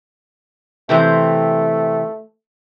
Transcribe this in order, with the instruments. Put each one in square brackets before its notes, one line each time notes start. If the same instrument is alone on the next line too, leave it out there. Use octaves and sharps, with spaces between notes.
[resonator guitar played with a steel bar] C3 E3 C4 [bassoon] A3